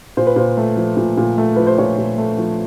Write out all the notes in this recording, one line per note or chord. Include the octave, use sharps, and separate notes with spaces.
A#2 C5
B4
A#2 C5
A3
F3
A#2
A#2
A3
F3 B4
C5
A#2 C#5
A#2
A3
F3